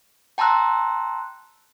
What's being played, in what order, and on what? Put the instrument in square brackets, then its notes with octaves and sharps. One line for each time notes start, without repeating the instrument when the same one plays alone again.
[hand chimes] G5 A5 A#5 C6 E6 F#6